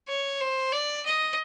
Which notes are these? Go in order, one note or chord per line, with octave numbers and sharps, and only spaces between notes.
C#5
C5
D5
D#5